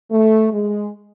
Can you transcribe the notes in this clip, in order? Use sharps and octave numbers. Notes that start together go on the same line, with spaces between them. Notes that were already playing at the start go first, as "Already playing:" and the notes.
A3
G#3